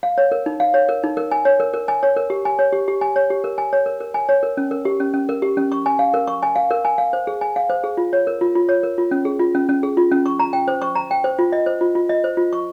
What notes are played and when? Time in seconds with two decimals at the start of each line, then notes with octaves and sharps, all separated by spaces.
0.03 F5
0.18 C#5
0.32 A#4
0.46 D#4
0.60 F5
0.74 C#5
0.89 A#4
1.03 D#4
1.17 A#4
1.31 G#5
1.45 C#5
1.60 A#4
1.74 A#4
1.88 G#5
2.03 C#5
2.16 A#4
2.30 G4
2.45 G#5
2.59 C#5
2.73 G4
2.88 G4
3.01 G#5
3.16 C#5
3.30 G4
3.44 A#4
3.58 G#5
3.73 C#5
3.86 A#4
4.00 A#4
4.14 G#5
4.29 C#5
4.43 A#4
4.57 C#4
4.71 A#4
4.85 G4
5.00 C#4
5.14 C#4
5.29 A#4
5.42 G4
5.57 C#4
5.72 C#6
5.86 G#5
5.99 F5
6.14 A#4
6.28 C#6
6.43 G#5
6.56 F5
6.71 A#4
6.85 G#5
6.98 F5
7.13 C5
7.27 G#4
7.41 G#5
7.56 F5
7.70 C5
7.84 G#4
7.97 F4
8.13 C#5
8.27 A#4
8.41 F4
8.55 F4
8.69 C#5
8.83 A#4
8.98 F4
9.11 C#4
9.25 G#4
9.39 F4
9.55 C#4
9.69 C#4
9.83 G#4
9.97 F4
10.11 C#4
10.26 C#6
10.39 A#5
10.53 G5
10.68 C5
10.82 C#6
10.95 A#5
11.11 G5
11.24 C5
11.39 F4
11.52 D#5
11.66 C5
11.81 F4
11.95 F4
12.09 D#5
12.24 C5
12.37 F4
12.53 C#6